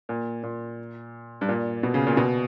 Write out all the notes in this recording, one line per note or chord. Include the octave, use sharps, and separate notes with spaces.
A#2
A#2
G2
A#2
B2
C#3
A#2
B2